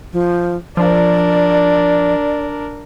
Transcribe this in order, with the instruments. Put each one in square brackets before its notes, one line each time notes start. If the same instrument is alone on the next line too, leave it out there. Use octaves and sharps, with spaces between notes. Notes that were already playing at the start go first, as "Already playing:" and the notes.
[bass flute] F3
[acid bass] F3 [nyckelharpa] D4 A#4 [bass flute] D5